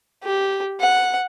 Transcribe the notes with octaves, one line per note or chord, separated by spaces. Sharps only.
G4
F#5